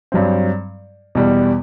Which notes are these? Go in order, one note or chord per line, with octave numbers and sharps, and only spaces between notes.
G2 F#3 C4
E2 B2 G3